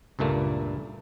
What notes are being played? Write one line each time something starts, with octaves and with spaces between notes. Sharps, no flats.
C#2 G2 A#2 A3 A#3